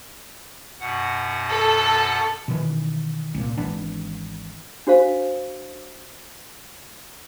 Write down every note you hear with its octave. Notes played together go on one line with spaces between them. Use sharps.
F#2 B2 F#5
A4
B2 D#3 E3
C2 A#2
G#1 E3 B3 D4
D4 F#4 C5 F5